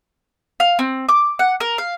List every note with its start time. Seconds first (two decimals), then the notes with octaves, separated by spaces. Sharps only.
0.60 F5
0.79 C4
1.09 D6
1.39 F#5
1.60 A#4
1.78 F5